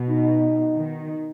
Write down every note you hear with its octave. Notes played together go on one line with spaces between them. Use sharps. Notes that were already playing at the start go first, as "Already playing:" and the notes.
Already playing: B2
D#4
D#3